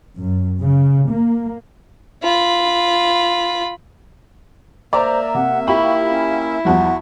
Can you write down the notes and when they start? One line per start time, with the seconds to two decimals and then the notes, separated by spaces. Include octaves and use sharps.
0.16 F#2
0.58 C#3
1.09 A#3
2.23 F4 B5
4.93 A#3 C5 D5 E5 A#5
5.34 C3 F#5
5.67 E4 F4 G4 B5 C#6
6.10 C#4
6.65 E2 F3 G3 F#4 F#5